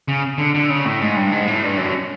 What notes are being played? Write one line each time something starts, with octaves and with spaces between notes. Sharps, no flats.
C#3
D3
D3
C#3
A2
G#2
G2
G#2
A2
G2
F#2